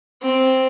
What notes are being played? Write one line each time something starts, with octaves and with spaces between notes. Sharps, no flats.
C4